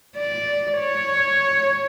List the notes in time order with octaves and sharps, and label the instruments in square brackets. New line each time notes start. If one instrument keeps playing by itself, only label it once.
[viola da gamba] D5
C#5